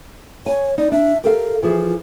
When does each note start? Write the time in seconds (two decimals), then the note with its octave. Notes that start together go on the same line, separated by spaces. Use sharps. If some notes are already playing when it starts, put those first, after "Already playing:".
0.46 C#5 G#5
0.78 D#4 D5
0.92 D4 E5
1.24 G4 A4 A#4 F5
1.63 E3 F3 F4 G#4